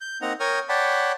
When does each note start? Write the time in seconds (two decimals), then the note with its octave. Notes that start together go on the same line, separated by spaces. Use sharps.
0.01 G6
0.22 A#3 C4 D#4 F#5 A#5
0.40 A#4 C#5 G5 C#6 D#6 F6
0.69 C#5 D5 F#5 G5 A5 B5